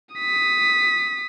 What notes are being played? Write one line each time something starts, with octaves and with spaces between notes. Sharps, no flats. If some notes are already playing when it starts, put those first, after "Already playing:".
D#6 B6